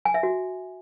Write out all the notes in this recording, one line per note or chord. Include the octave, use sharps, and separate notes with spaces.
G#5
E5
F#4